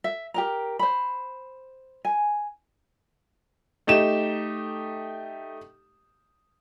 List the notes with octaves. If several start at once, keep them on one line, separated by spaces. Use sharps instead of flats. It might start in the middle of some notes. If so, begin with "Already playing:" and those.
E5
G4 A#4 A#5
C5 B5
G#5
A3 D#4 G4 E7